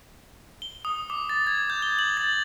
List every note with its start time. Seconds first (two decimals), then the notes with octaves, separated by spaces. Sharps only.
0.62 G7
0.85 D#6
1.10 D6
1.29 A6
1.47 G#6
1.70 G6
1.82 G7
1.99 F#7
2.17 A6